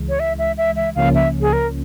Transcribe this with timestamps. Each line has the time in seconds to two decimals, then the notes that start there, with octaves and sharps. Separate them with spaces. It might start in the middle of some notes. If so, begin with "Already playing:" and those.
Already playing: C#2 C#3 E3 G#3
0.09 C#5
0.20 E5
0.39 E5
0.58 E5
0.76 E5
0.96 C#2 C#3 F3 A#3 C#4 F5
1.15 E5
1.41 G#4
1.53 A#4